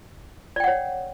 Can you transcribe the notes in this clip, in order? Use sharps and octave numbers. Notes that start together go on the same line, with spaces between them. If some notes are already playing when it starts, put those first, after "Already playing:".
C#5 D5 F#5 G5